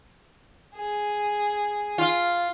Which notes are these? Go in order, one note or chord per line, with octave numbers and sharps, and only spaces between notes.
G#4
F4